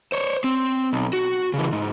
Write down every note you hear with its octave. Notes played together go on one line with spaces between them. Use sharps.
C5 C#5
C4
B1
F#4
C#3 E3
G#2